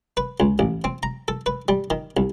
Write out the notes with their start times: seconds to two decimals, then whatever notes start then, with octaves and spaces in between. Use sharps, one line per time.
0.17 B4
0.40 C#2
0.59 A1
0.84 C4
1.03 A#5
1.28 A4
1.46 B4
1.68 G3
1.90 D#3
2.17 C2